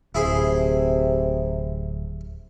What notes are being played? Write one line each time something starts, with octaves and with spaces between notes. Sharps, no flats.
D1 C3 E4 G#4 C5